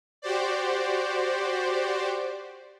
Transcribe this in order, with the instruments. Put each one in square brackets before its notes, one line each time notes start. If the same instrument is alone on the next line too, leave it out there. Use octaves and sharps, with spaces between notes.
[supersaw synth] F#4 G4 C5 D5